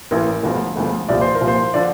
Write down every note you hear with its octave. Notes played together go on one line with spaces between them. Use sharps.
A1 A2 E3 A#4
E1 D2 D3 F3
E1 D2 D3 F3
C2 A#2 F3 D5
C5
A#4
C2 A#2 F3
C5
D3 F3 D5